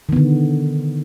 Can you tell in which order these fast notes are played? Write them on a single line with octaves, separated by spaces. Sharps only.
D#3 B3 D3